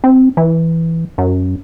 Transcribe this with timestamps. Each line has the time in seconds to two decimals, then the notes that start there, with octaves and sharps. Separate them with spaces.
0.04 C4
0.37 E3
1.18 F#2